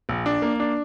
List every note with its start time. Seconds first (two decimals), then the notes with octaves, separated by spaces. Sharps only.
0.09 A#1
0.26 D4
0.42 A#3
0.60 D4